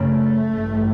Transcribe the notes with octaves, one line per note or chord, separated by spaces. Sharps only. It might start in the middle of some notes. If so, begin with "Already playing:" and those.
Already playing: F#2 C#3 A3
A1 G2